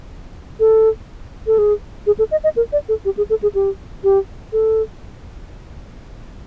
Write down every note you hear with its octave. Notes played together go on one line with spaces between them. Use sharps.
A4
A4
G#4
G#4
A4
D#5
D#5
A#4
D5
A4
G4
G#4
A4
G#4
G4
G4
A4